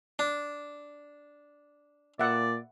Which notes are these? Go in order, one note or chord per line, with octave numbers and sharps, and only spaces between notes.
D4
A#2 D5 E5 F#5